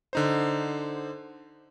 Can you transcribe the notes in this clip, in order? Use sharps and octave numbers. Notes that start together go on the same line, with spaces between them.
D3 D#4 C5